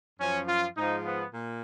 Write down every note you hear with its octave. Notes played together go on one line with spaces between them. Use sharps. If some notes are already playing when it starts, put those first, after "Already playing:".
F#2 F3 C#4
F4
G#2 F3 D#4
B3
A#2